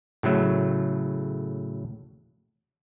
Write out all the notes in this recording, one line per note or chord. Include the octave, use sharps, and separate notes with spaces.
A2 C#3 F#3 A3